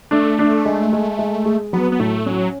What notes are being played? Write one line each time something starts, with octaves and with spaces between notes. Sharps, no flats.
A3 D4
D4
G#3
G#3
G#3
G#4
F#3 B3
B3
A2 A3
F#3 C#4